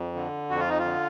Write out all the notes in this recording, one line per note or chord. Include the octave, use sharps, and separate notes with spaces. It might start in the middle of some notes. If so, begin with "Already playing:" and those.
Already playing: F2
D3
F2 F#4
F4
D#4
F4
D3